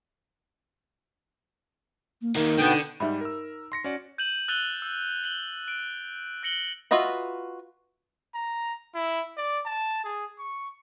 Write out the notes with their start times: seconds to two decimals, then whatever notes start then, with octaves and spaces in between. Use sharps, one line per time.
2.22 A#3
2.36 D#2 A#3 D#4
2.58 B2 D3 B3 G5
3.00 G#2 G3 D#4 E5 B5
3.21 A#4 E6
3.72 C6 A#6 C#7
3.84 C#4 F#4 D5
4.18 G6 D#7 E7 F#7
4.48 E6 F#6 A6 D#7 F7 G7
4.82 E6
5.24 F#7 G7
5.68 F#6 D7
6.43 F#6 A#6 C#7 F#7 G7
6.91 F4 F#4 B4 D#5 E5
8.35 A#5
8.95 E4
9.38 D5
9.66 A5
10.04 G#4
10.39 C#6